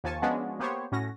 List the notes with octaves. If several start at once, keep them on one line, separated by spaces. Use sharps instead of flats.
D#2 F3 G#5 A5 C#6
F3 G#3 B3 C#4 D4 F#4
A#3 B3 G4 C5 C#5
A2 C#4 F#4 A#6